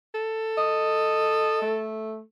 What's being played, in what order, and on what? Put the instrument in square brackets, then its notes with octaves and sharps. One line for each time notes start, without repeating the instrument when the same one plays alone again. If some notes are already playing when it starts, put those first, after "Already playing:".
[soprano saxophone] A4
[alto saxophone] D#5
A3